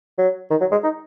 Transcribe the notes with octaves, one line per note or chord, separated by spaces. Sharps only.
F#3
D#3
F#3
G#3
D#4